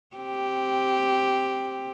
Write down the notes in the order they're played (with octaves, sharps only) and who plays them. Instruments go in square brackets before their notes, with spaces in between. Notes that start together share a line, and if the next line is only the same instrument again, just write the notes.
[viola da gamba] C4 G4